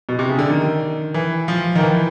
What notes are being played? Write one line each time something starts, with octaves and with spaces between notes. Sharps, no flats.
B2
C3
C#3
D3
D#3
E3
F3
D#3
E3